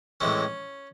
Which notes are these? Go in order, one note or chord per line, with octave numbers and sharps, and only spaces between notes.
A2 E3 G#3 C4 C#4